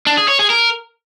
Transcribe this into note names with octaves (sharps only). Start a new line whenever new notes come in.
D4
G#4
C#5
G#4
A#4